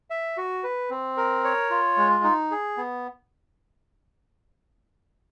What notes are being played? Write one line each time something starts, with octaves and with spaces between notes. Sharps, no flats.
E5
F#4
B4
C4
A#4
C#5
F4
G#3
D#4
G#4
B3